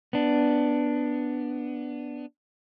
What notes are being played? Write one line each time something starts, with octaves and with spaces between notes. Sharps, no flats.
B3 D4